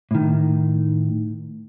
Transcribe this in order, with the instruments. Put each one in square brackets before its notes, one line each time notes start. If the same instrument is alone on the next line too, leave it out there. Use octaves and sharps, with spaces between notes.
[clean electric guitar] A2 D#3